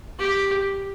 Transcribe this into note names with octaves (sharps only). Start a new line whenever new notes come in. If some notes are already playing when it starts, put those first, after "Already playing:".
G4